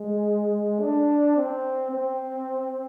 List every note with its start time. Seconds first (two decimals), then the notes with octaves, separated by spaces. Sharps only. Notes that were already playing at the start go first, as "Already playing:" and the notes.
Already playing: G#3
0.80 D4
1.36 C4
1.92 C4